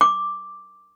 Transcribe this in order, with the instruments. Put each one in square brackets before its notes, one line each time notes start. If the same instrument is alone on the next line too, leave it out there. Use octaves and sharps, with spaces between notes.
[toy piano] D6